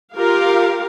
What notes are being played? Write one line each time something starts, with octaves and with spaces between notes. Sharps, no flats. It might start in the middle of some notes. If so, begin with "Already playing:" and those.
F4 G4 A#4 F5